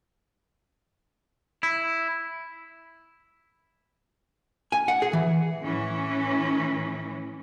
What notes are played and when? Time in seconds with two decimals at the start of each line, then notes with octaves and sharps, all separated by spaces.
1.63 E4
4.72 G#5
4.88 F#5
5.02 G#4
5.13 E3
5.66 A2 E3 C#4